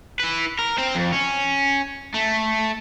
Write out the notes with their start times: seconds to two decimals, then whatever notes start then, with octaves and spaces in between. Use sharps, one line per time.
0.20 E4 B4
0.59 A#4
0.78 C4 C5
0.95 F2
1.13 C#4
2.14 A3